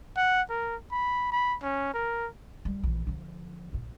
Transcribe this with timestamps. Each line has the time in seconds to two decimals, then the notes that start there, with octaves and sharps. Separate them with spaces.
0.17 F#5
0.50 A#4
0.92 B5
1.32 B5
1.63 C#4
1.94 A#4
2.65 G3
2.83 A#1 E3
3.07 D3 F3
3.73 A#1 F4